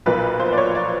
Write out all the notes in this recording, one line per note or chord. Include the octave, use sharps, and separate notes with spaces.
B1 A#2 F3 A#3 B4
C5
D5
C#5
D5